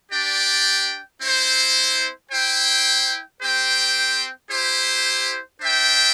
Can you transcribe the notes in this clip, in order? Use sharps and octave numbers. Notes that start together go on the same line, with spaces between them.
D4 G4 D5 G5
C4 E4 C5
E4 C5 G5
C4 G4 C5 G5
E4 G4 C5
D4 C5 E5 G5